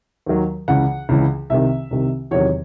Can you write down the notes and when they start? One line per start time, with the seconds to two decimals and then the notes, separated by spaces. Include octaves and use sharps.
0.26 D#2 D#3 F#3
0.68 C#2 C#3 E3 F#5
1.09 C#2 C#3 E3
1.50 C2 C3 D#3 E5
1.91 C2 C3 D#3
2.31 E2 C3 D#3 F#3 C#5